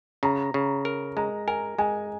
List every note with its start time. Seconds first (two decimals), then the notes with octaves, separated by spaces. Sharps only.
0.23 C#3 A#5
0.54 C#3
0.85 A#4
1.17 G#3 A#5
1.47 A#4 G#5
1.78 G#3 G#5